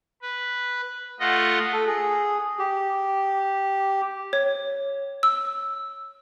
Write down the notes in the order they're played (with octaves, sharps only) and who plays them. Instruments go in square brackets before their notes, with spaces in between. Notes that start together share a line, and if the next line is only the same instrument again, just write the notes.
[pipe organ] B4
A3 F4 D#5 F#5
[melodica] A4
G#4
G4
[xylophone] C#5
E6